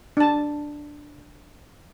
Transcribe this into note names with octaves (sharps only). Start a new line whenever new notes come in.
D4 A5